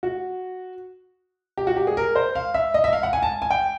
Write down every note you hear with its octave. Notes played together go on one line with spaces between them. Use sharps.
F#4
G4
F#4
G4
G#4
A#4
C5
F5
E5
D#5
E5
F5
F#5
G#5
A5
G#5
G5